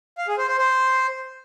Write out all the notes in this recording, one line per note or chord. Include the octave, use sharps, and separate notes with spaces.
F5
G#4
C5
C5
C5